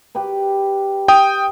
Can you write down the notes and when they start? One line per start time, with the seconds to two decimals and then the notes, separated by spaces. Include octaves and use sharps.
0.15 G4 B4
1.08 G5 D#6